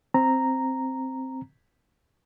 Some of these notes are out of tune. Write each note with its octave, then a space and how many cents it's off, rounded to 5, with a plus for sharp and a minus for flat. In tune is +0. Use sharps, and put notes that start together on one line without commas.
C4 +0 A#5 -5